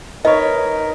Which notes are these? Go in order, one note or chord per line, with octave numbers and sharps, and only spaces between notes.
D#4 A#4 B4 C#5 D#5